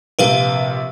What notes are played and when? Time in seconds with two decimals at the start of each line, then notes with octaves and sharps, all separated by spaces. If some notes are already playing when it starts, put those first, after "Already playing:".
0.19 A#1 C3 A#4 B4 F5